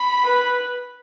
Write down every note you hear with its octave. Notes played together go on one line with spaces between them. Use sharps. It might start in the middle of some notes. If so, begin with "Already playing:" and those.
Already playing: B5
B4